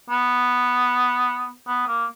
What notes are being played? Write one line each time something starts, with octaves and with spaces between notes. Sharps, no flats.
B3
B3
A#3